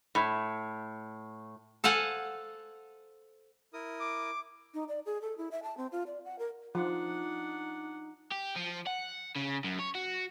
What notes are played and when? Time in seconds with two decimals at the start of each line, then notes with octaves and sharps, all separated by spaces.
0.15 A2
1.84 A4 C5 F5 F#5 G#5
3.73 E4 A#4 D#6
4.00 D6
4.74 D#4
4.88 D5
5.06 G#4
5.22 A4
5.38 E4
5.51 E5
5.63 A5
5.77 C4
5.92 F4
6.07 D5
6.25 F#5
6.39 A#4
6.75 F3 D4 D#4 F#5
8.32 G4
8.56 F3
8.87 F#5
9.36 C#3
9.64 F#2
9.79 C#5
9.95 F#4